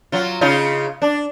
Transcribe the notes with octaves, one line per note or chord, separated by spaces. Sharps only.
F#3 F4
C#3 D#4 F4
D4